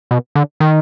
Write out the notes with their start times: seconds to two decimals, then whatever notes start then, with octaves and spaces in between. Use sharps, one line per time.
0.11 B2
0.35 D3
0.60 D#3